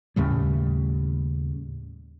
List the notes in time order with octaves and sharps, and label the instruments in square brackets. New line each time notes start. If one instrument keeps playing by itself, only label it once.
[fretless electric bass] D#2 A2 C#3 G3